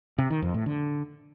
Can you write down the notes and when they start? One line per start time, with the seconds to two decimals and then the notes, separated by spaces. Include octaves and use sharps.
0.18 C3
0.30 D#3
0.42 F2
0.54 A2
0.66 D3